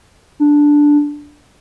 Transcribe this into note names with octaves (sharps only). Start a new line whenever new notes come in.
D4